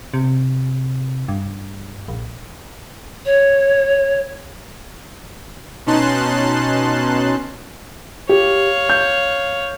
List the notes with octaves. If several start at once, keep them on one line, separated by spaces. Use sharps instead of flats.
C3
G2
A#1
C#5
B2 C#4 D#4 A5 C6 F#6
G4 C#5 F5
G6